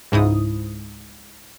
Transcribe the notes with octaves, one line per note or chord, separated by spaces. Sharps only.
C#2 G#2 E4 D#6